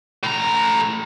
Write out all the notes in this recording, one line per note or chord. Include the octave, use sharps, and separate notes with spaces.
A2 A#5